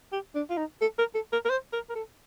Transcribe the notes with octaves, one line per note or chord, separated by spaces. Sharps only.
G4
D4
F4
D#4
A4
A#4
A4
A#4
A#4
C5
A#4
A#4
A4